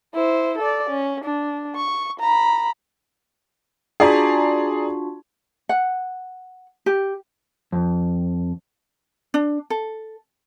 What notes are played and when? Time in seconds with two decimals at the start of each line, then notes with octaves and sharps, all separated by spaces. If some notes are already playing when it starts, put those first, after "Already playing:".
0.14 E4 C5
0.58 A4 D5
0.90 C#4
1.24 D4
1.76 C#6
2.20 A#5 B5
4.00 D4 F4 F#4 G#4 D5 A#5
5.69 F#5
6.86 G4
7.72 F2
9.34 D4
9.70 A4